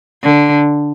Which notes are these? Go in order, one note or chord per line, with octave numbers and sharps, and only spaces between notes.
D3